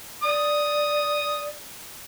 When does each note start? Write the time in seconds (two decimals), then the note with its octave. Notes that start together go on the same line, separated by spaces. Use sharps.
0.23 D5 D#6